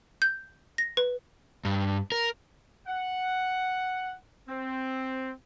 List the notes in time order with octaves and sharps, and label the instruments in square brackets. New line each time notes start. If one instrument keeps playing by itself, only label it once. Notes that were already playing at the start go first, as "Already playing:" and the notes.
[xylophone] G6
A#6
B4
[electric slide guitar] G2
A#4
[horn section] F#5
C4